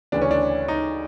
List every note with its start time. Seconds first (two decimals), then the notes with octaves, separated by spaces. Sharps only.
0.12 D2 C#3 E3 D4
0.21 C#4
0.31 D4
0.68 D#4